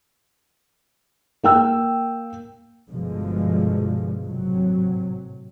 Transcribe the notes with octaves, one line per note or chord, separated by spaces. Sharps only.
A#3 G5 E6
G1 B2 D3 F3 G#3
G#1 A2 C3 F#3